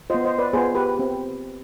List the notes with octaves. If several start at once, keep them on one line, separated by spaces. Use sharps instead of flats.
B3 F4 C5 D#5
C5 D#5
B4 D5
B3 F4 G#4 C5
G4 B4
C4 G4